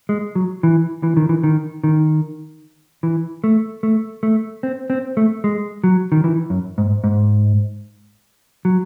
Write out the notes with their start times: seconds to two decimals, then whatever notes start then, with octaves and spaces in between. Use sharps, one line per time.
0.09 G#3
0.35 F#3
0.63 E3
1.03 E3
1.17 D#3
1.29 E3
1.44 D#3
1.84 D#3
3.03 E3
3.44 A3
3.83 A3
4.23 A3
4.63 C4
4.90 C4
5.17 A3
5.44 G#3
5.84 F#3
6.12 D#3
6.24 E3
6.50 F#2
6.78 G#2
7.04 G#2
8.65 F#3